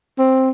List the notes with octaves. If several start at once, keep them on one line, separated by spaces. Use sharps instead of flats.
C4